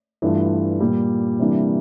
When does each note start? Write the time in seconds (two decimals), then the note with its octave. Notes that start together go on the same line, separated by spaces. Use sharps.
0.22 G2 E3 A3 D4 F4
0.80 A#2 G3 A#3
1.39 C3 E3 G3 A#3 D4